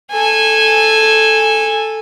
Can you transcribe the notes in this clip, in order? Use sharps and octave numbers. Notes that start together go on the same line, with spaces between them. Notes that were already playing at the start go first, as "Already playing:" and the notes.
A4 G#5